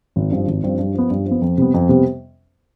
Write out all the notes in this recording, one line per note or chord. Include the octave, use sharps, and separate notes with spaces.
G#1
G2 F3 C4
G#1
G2 F3 C4
G2
F3 B3
G2
F3
B3
F2
C3 G3 B3
F2
C3 G3 B3